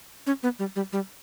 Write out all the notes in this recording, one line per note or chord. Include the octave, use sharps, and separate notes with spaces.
C#4
B3
G3
G3
G3